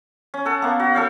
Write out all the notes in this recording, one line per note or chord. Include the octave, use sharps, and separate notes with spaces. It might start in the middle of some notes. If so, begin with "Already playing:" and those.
C#4
A4 F#5 A5
A#3 B3
F#4
A4 C#5 F5 G5